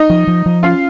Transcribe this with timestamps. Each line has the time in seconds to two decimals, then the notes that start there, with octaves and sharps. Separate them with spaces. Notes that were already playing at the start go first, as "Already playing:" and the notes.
Already playing: D#4 D#5
0.10 F3
0.27 F3
0.46 F3
0.63 C#4 F4 F5